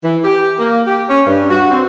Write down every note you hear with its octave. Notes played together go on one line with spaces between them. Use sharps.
E3
G4
A#3
G4
C#4
G2
F#4
C4